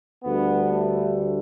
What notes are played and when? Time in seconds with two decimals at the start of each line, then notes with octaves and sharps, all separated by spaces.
0.24 D2 D3 G3 B3
0.72 A3